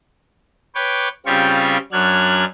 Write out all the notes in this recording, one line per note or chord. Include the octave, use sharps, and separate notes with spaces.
B4 C#5 G5 D6
C#3 G3 C4 F4 G4 C#6
F#2 F#3 D4 F6 F#6 G#6